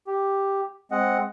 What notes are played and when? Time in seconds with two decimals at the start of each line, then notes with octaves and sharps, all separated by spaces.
0.07 G4
0.92 G#3 C4 D#5 F#5